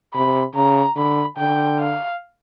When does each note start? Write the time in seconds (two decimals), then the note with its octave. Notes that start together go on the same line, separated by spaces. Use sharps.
0.14 C3 B5
0.55 C#3 A#5
0.96 D3 B5
1.38 D3 G5
1.79 F5